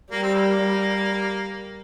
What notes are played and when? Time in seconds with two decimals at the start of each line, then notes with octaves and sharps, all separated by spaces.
0.11 G3 A#3
0.23 C4
0.34 A#3
0.62 G3